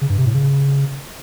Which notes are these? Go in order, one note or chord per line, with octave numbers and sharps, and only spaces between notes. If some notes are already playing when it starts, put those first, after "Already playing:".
C#3
G2
C3
A2
C#3